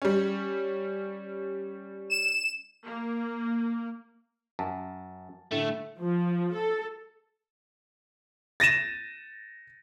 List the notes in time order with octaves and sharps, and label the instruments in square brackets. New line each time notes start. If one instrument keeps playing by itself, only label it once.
[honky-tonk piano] G3 C#4
[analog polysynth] E7
[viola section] A#3
[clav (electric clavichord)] F#2 [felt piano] A5
[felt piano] A2 D3 E5 [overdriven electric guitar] A3
[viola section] F3
A4
[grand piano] A6 A#6 D#7 E7